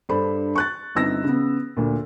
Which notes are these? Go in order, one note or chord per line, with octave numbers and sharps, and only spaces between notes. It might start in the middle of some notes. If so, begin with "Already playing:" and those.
G2 D4 A4 C5 B5
C#6 F#6 A6
G1 C4 D#4 E6 A#6
C#3 B3
D2 A#2